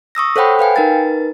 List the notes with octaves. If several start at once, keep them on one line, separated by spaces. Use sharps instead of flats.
C#6 D#6 E6 A#6
A4 C5 C#5 F#5 G5 B5
B4 F5 G5 G#5
D#4 A#4 B4 A6